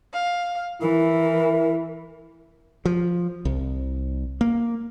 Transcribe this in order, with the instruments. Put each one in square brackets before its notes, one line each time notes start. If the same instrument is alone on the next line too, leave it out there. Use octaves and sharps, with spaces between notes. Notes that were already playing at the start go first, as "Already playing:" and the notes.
[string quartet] F5
[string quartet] E3 [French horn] E4 [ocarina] A#4
[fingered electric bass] F3
C2
A#3